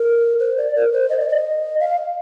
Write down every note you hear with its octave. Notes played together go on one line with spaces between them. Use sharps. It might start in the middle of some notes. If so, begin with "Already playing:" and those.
Already playing: A#4
C5
D5
A#4
C5
D#5
D5
D#5
F5